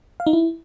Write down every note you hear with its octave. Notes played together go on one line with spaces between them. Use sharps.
F5
D#4
E4